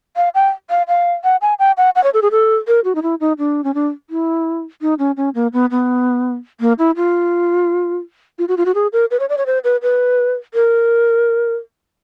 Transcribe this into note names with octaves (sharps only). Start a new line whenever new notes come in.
F5
G5
F5
F5
F#5
G#5
G5
F#5
F#5
C#5
A4
G#4
A4
A#4
F#4
D#4
E4
D#4
D4
C#4
D4
E4
D#4
C#4
C#4
A#3
B3
B3
A#3
E4
F4
F4
F#4
F4
F#4
G#4
A#4
B4
C#5
D5
C#5
C5
B4
B4
A#4